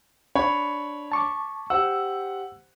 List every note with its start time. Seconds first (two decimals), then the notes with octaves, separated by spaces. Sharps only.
0.35 D4 C#5 B5
1.12 A5 C#6 D6
1.70 G4 C5 F#5 E6